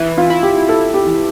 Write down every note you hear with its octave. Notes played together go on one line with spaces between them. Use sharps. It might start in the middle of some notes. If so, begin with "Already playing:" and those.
Already playing: E3 E4
F4
E4
G4
E4 A4
G4
E3